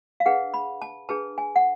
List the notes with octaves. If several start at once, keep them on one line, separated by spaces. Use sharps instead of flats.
F5
D4 G#4 B4 F#5
B5
A5
D4 G#4 B4 A5
G#5
F#5